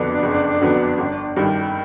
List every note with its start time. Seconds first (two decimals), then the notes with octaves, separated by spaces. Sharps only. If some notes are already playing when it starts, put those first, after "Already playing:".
Already playing: F#1 F2 D3 F#3 B3 D4
0.23 F#1
0.61 F2 D3 F#3 B3
0.98 G1
1.36 G2 D#3 G3